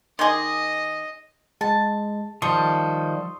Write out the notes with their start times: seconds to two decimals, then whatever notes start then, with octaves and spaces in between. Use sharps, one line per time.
0.19 D#3 G#4 D#5 C6 D6 D#6
1.61 G#3 A5
2.42 D#3 F3 G3 A4 C6 C#6 D#6